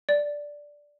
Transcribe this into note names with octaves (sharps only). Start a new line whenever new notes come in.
D5